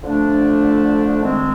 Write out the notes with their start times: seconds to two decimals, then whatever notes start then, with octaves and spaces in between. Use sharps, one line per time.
0.03 D3 F3 A3 D4
1.23 D#3 G#3 C4